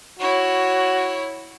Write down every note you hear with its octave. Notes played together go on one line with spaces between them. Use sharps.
E4 F#4 C#5